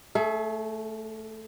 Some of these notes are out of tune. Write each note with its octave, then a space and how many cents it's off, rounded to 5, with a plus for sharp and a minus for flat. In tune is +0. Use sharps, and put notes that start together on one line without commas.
A3 +0 G#4 +40